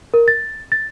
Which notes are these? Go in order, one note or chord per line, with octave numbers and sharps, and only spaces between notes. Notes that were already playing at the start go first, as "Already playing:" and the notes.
A#4
A6
A6